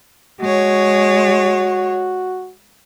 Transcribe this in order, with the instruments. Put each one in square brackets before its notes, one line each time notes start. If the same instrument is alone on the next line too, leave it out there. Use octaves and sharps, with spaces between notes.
[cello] G#3 C#5 [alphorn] F#4